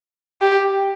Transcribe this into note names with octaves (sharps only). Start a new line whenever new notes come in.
G4